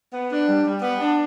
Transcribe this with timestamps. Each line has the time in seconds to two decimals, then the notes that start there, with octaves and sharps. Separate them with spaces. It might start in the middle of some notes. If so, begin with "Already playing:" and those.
0.13 B3
0.31 D4
0.48 G3
0.66 G3
0.82 B3
1.00 D4